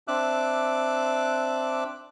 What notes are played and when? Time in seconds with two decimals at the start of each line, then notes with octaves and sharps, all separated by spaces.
0.08 C4 D4 E5 D6 F#6